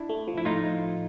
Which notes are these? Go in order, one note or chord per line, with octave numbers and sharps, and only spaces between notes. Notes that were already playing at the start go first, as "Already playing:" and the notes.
Already playing: D4 E4
A3
F3
E4
A2 D#4 F4